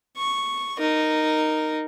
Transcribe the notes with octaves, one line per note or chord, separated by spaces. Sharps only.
C#6
D#4 A#4